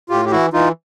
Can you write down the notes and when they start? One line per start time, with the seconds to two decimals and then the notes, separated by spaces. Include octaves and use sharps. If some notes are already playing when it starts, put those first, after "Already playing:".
0.09 A2 F4 G4
0.25 G4
0.31 E3 E4 F#4
0.53 E3 D#4 F4